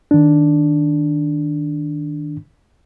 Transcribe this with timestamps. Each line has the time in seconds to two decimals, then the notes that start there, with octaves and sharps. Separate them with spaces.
0.11 D#3 D4